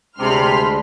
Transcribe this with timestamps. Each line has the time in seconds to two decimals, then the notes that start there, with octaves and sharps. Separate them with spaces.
0.18 D2 C3 G#3 D4 B5 C6 F6